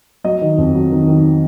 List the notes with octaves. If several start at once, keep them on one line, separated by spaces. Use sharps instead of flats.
F#3 D#5
D#3
F2
F#3
D#3
D#3